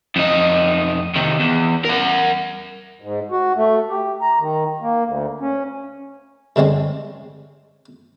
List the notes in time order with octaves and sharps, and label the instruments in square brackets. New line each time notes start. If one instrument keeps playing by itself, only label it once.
[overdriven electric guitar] F2 D#4
C3 D#3
E2
A#4 F#5
[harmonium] G#2
F#4
A3
G4
A#5
D#3
A#3
D2
C#4
[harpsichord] G2 D3 G#3 C4 C#4